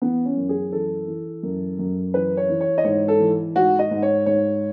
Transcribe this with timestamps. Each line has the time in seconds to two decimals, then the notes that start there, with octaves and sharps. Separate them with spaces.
0.02 E3 B3
0.25 C#4
0.37 F#2
0.49 G#4
0.72 E3 A4
1.08 E3
1.43 F#2
1.79 F#2
2.14 E3 B4
2.37 C#5
2.49 E3
2.61 C#5
2.78 D#5
2.84 G#2 C#5
3.08 A4
3.20 E3
3.55 G#2 F#4
3.79 D#5
3.91 G#2
4.03 C#5
4.26 G#2 C#5